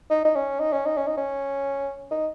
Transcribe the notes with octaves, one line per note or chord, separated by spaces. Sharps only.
D#4
D#4
C#4
D#4
C#4
D#4
C#4
D#4
C#4
D#4